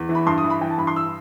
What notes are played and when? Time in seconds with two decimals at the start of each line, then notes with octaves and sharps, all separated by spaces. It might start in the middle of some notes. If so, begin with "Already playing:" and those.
Already playing: E2
0.09 E3
0.15 B5
0.26 G2 C6
0.38 D#6
0.44 E3
0.50 B5
0.61 E3 G5
0.70 A5
0.78 G2 B5
0.87 C6
0.96 E6